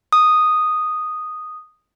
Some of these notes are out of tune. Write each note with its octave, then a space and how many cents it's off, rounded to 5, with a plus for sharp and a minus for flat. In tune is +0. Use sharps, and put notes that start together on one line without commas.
D#6 -5